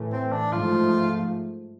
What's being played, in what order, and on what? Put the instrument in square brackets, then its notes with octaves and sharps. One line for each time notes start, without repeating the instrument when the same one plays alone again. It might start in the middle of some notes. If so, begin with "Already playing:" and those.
Already playing: [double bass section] A2 E3 A3
[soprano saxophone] C4
D4
[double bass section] G#2 F3 A3 [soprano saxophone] F4